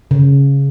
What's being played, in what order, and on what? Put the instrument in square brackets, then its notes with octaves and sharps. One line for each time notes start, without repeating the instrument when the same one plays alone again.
[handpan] C#3